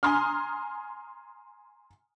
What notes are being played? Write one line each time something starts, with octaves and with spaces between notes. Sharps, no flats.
G#5 A#5 C6 D#6 F6